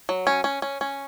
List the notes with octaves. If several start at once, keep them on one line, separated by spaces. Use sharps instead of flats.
F#3
C#4
C#4
C#4
C#4